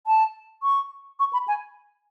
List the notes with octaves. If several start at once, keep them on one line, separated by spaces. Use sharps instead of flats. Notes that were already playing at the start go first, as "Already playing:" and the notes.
A5
C#6
C#6
B5
G#5